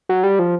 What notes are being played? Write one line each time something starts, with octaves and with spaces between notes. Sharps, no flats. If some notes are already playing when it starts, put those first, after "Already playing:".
F#3
G3
F3